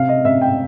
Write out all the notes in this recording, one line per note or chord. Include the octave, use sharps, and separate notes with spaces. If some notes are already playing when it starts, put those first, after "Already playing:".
Already playing: C3 F5
D#5
C3 E5
G5